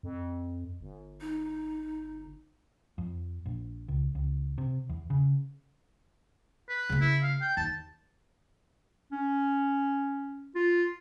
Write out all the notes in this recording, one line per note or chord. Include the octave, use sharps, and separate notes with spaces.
F2
G1
D#4
F2
A#1
C#2
C#2
C3
E2
C#3
B4
C#3 A#3
E4
F5
G5
D#2 A5
C#4
F4